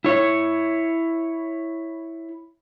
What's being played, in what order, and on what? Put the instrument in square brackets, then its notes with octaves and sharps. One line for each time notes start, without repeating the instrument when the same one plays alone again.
[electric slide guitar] E4 C#5